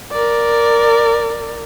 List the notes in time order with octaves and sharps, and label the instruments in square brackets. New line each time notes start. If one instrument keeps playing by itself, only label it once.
[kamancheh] A#4 D5